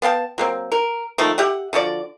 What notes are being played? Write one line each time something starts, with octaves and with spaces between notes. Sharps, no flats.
B3 F5 G5 A5
F#3 A#3 C4
A#4
D#3 F3 A3 A#3
G4 E5 F#5
D3 F3 F#4 D5